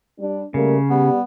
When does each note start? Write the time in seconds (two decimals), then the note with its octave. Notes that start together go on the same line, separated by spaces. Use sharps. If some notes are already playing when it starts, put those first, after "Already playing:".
0.19 G3 D4
0.54 C#3 G3 A3 A#3
0.90 G3 B3